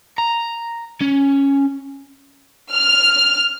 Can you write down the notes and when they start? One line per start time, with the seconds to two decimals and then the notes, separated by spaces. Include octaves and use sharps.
0.18 A#5
1.01 C#4
2.72 F6